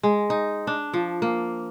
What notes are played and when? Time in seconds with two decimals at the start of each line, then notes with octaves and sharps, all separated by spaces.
0.03 G#3
0.30 D#4
0.67 D4
0.94 F3
1.22 A#3